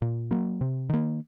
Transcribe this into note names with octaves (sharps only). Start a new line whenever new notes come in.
A#2
F#3 A#3
C3
D#3 A#3